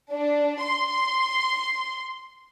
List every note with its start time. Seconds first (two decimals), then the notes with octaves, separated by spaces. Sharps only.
0.12 D4
0.63 C6